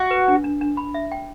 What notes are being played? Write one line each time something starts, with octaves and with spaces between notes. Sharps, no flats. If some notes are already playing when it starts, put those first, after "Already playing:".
Already playing: F#4
B4
D4
D4
D4
B5
E5
G5